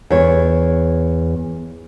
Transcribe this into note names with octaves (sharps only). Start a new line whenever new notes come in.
E2 C#5